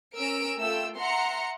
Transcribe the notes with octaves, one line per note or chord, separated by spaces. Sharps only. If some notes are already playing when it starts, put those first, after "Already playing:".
C#4 A#4 E6 D7
A3 F4 G5 E6
E5 F#5 A#5 C6 C#7